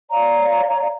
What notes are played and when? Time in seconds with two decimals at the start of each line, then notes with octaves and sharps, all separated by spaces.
0.10 C#5 D5 F5 A#5